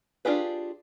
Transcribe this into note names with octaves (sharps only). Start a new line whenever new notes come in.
D4 F4 G4 G#4 B4